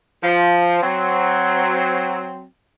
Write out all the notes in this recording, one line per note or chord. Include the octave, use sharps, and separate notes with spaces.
F3
F#3 C4